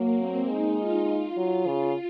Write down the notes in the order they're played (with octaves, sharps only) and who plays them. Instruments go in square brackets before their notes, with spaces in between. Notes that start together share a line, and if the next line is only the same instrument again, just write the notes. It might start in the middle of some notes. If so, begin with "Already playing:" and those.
Already playing: [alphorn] F#3 [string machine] A#3
[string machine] C4
[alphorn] G#3 [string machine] D#4
[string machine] F4
[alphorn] F#3
[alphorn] C#3 [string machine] F4